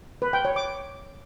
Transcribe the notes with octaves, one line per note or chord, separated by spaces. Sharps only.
B4
G5
C#5
D6